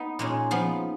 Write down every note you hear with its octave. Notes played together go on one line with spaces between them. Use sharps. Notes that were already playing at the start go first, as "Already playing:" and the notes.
Already playing: B3 D#4
A#2 G#3 C#4
F3 B3 D#4